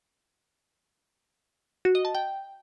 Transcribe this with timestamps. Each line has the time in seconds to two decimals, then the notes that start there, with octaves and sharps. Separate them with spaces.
1.85 F#4
1.95 D#5
2.05 A5
2.15 G5